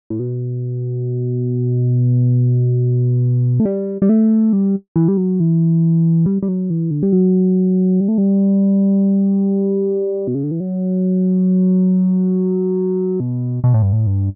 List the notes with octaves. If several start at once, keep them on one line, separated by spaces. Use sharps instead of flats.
A2
B2
A3
G3
G3
A3
G3
E3
G3
F#3
E3
G3
G3
F#3
E3
D3
G3
F#3
G3
A3
G3
B2
C#3
D3
E3
F#3
B2
B2
A2
G2
A2
G2